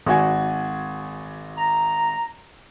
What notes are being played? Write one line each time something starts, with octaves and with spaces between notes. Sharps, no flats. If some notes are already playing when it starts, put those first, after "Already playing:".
G#1 F#4 G#5
A#5